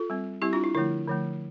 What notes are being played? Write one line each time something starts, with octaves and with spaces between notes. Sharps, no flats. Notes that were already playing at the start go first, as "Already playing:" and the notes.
Already playing: F4 A4
G3 C4
G3 C4 E4 G4
D4 F4
E4
D3 F3 A3 E4
D3 F3 A3